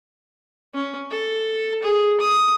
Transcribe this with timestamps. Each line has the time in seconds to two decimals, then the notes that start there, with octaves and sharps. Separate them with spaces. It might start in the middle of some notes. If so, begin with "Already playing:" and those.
0.74 C#4
1.10 A4
1.83 G#4
2.21 D#6